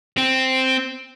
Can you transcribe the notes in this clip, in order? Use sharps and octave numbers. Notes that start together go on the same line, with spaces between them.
C4